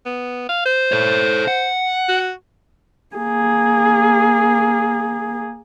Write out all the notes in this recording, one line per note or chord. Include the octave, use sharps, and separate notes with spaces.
B3
F5
C5
A4 C#5
F#5
F#4
A#3 G#4